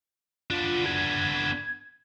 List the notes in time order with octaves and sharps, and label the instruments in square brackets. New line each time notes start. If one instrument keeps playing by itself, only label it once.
[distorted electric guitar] B3 D4 [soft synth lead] F4
[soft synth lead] G#6